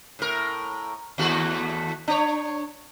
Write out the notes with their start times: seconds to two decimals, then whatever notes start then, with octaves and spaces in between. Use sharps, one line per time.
0.19 A2 A#4
1.18 D#2 A3 F#4
2.08 D4 C#5